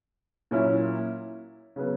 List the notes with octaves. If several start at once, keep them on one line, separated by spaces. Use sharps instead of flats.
A#2 F#3 C#4 E4
C#3 F#3 B3